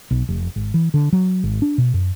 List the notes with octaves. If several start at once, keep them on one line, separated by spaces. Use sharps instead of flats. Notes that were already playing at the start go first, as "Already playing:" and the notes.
B1
F1
G#1
E3
D3
F#3
G#1
D4
B2
F#2